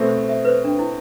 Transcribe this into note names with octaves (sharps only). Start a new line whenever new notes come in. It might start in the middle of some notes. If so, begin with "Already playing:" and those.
Already playing: B2 A3 C4
C5
E5
B4
C5
D4
E4